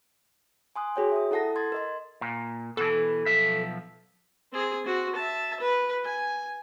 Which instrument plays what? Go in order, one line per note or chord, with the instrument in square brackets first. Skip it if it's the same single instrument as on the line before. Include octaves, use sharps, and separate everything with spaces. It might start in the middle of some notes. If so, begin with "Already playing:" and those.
[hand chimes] G#5 C6 D#6 F#6
F#4 G#4 C#5 G5
E5 D#6
E4 A4 F#5 A5 A#6
C6 G#6 A6
A#4 D#5 C6
[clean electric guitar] A#2
[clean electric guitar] B2 E3 [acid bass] A4
[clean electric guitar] B1 F3 E5
[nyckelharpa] C4 G#4
C4 F#4
E5 A5
B4
G#5